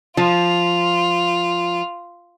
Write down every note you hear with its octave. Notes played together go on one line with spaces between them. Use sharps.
F3 F4